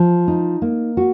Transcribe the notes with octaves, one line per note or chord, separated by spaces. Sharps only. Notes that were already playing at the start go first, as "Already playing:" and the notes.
Already playing: F3
D#4
A#3
F#4